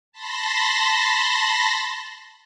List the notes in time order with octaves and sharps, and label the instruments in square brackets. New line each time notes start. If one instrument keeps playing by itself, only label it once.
[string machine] A5 B5 C6 A#6